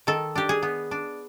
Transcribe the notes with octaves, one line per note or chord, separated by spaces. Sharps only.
D#3 A4
D4 G4
G#4
B3
D4